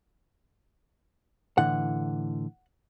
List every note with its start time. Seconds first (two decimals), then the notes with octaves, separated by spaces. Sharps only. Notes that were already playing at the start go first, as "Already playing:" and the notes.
1.58 A2 D3 E3 F#5